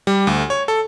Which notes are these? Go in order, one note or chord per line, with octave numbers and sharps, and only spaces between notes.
G3
D2
C#5
A4